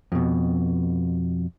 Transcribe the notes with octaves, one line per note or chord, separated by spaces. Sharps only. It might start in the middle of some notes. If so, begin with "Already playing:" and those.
F2 B2